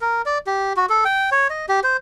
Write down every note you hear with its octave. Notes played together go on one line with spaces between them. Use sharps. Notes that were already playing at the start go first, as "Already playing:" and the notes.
A#4
D5
G4
F#4
A4
G5
C#5
D#5
G4
C5